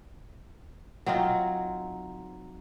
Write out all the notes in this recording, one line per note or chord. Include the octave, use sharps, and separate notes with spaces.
F#3 C4 D#4 F4